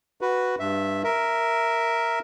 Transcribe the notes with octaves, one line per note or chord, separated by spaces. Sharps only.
F#4 B4
G2 E5
A#4 E5